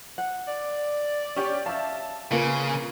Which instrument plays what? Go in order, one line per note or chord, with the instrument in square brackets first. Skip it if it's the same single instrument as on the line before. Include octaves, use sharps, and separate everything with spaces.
[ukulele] F#5
[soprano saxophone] D5
[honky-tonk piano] C#4 G4 [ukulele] C#5
[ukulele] E5 F5 [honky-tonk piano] A5
[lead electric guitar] C#3 [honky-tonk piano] A#3 B4 [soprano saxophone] F4